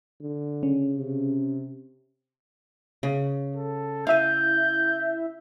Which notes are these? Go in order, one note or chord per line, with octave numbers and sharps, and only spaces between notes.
D3
C#3 C#4
C3
C#3
A4
E4 E5 F5 G#5 G6